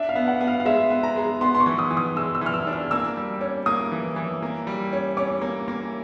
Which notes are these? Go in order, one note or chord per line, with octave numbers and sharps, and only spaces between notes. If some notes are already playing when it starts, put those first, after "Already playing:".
Already playing: D4 E5
F5
B3
F#5
B3
F5
F5
G#3 E5
B3
A#5
G#3
B3 C6
C6
C#6
E3
D#6
E3
D#6
G#3 E6
E6
E3 F6
E6
D4
F6
A#3 E6
G3
C#4
A#3 D#6
E3
E3
A#3
G3
C#4
C#4 D6
A#3
A#3